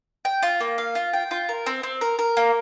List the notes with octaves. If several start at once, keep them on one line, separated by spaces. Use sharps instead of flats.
G5
F4
A#3
F5
F4
G5
F4
A#4
C4
C4
A#4
A#4
A#3